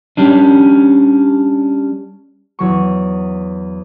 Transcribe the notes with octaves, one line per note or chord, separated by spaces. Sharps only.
G3 C#4 D4
E2 F#3 C#6